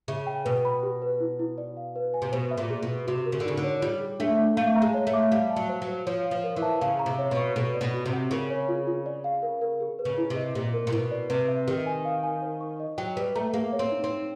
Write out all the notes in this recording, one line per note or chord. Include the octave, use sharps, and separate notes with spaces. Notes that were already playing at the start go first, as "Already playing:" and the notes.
C#3 E5
G5
B2 B4
B5
G4
B4
E4
E4
D5
F5
B4
G#5
C3
B2 C5
E5
A#2
G#4
B2
G#4
C3 F#4
A#4
C#3
D3
C#3 D#4
D3
C#5
G3 F4
G#4
A3 D4
D4
A3 F5
A#5
G#3
C#5
A3
D6
G3 F5
A5
F#3
C5
F#3
C5
F3 C#5
F5
F3
A#4
E3
A5
C#3 F5
A#5
C3
C#5
B2
C#6
B2 A4
D5
B2
F#4
C3
F#5
C#3 A#4
C#5
F4
F4
D5
F5
A#4
A#4
G#4
B4
C#3
E4
C3
D#5
A#2 G4
A#4
A#2
B2 E4
D5
C3 B4
E5
D#3 G4
G#5
F5
G#5
C5
C#6
D#5
F#3 G5
G3 B4
A3 A#5
A#3 G#4
C#5
C4
D#4
C4
D#4